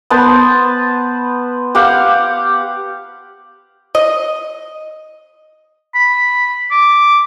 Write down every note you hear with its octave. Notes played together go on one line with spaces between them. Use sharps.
B3 B4 C5 A5
G4 F5 F#5
D#5
B5
D6